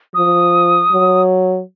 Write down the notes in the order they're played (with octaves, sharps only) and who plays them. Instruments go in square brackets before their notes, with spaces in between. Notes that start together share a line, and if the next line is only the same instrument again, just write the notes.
[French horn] F3 [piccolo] D#6
[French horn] F#3